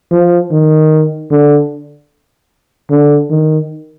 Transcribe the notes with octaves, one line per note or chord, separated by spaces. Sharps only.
F3
D#3
D3
D3
D#3